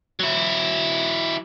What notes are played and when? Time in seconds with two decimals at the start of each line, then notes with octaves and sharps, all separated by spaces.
0.20 F#3 E4